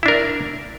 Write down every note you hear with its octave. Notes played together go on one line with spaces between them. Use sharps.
D4 E4 A#4